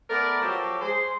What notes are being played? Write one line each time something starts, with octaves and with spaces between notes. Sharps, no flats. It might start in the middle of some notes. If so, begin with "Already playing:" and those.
A3 B3 A#4 D5
F3 F#3 F#4 G4 A4
G#3 G#4 C5 C6